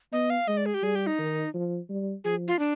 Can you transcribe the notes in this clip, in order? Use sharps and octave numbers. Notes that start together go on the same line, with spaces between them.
B3 D#5
F5
G#3 D#5
D5
G#4
G4
G3 G#4
G4
D#4
D#3
F3
G3
F3 G#4
F4
D4